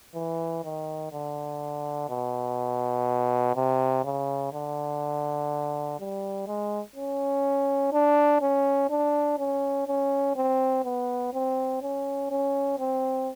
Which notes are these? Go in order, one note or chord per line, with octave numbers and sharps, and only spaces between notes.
E3
D#3
D3
B2
C3
C#3
D3
G3
G#3
C#4
D4
C#4
D4
C#4
C#4
C4
B3
C4
C#4
C#4
C4